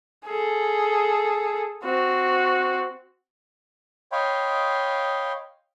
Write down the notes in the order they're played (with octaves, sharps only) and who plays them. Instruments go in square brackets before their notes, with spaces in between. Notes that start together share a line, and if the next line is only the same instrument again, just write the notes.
[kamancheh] G#4 A4
C4 F#4
[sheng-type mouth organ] C#5 D#5 F5 G5 B5 C6